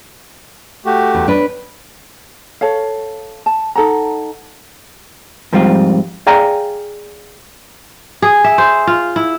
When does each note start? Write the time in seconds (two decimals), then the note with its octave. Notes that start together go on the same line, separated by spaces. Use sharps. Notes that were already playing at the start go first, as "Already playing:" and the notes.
0.86 A3 F#4 G4
1.15 E2
1.28 D4 B4
2.61 A4 C#5 F5
3.46 A5
3.75 D#4 A4 F#5 A#5
5.53 G#2 F3 G3 C4 F4
6.27 G#4 D5 F5 G5 G#5 A#5
8.22 G#4
8.44 E5
8.58 C5
8.87 F4
9.16 E4